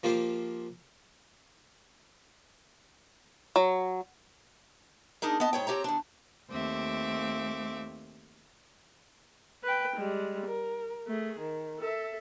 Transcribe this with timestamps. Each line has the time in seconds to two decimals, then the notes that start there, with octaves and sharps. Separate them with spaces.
0.03 F3 A#3 F4 G4 C5
3.56 F#3
5.22 D4 D#4 G#4 A#4
5.40 B3 D#5 A5
5.53 G#2 C#5 G5
5.67 C4 G4 C#5 A#5
5.84 D#3 D4
6.49 D#2 A3 C4 E5 D6
9.64 B4 G5
9.96 G3 G#3
10.46 A#4
11.07 A3 G#4
11.40 D#3
11.79 A4 E5